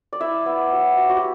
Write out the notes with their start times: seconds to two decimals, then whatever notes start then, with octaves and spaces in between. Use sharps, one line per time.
0.13 D5
0.20 E4 E5
0.46 B3
0.72 F#3
0.97 F#3
1.09 F#4
1.16 G4